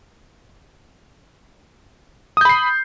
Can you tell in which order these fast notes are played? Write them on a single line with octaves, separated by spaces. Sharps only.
D#6 G6 B5 C7